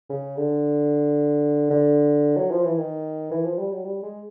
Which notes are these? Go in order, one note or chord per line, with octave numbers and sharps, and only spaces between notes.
C#3
D3
D3
F#3
F3
E3
D#3
E3
F3
G3
F#3
G3
G#3